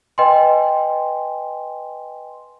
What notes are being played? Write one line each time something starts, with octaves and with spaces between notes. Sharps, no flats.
B4 D#5 G5 G#5 C6